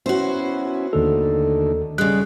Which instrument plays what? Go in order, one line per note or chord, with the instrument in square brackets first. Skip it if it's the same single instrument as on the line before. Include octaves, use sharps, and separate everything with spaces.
[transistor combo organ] B3 C#4 E4 [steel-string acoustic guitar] F#4 C5
[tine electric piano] D#2 A4 [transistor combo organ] D3 D#3 A3
[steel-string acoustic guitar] C#3 G#3 [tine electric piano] G3 F#6